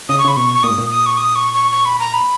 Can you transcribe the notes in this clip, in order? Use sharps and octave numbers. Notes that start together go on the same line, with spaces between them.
C#3 D#6
C#6
C#3 B5
B2 C#6
C#6
A#2 D#6
G#2
A#2
D#6
C#6
D#6
C#6
C#6
C#6
B5
A#5
B5